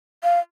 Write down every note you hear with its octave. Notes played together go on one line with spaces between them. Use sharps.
F5